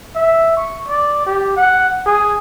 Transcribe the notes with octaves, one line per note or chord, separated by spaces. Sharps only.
E5
C#6
D5
G4
F#5
G#4